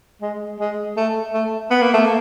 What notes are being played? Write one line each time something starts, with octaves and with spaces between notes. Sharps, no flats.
G#3
G#3
A3
A3
B3
A#3
A3
A#3